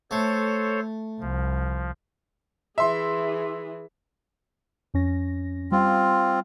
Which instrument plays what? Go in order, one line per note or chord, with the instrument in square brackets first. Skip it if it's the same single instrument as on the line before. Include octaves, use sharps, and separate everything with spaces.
[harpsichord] A3 [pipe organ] A4 C5 C#5
[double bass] C2 [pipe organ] F3
[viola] E3 G#4 [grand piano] E5 C6
[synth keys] F2 C#4 A#6
[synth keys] G3 F5 [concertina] C4 F4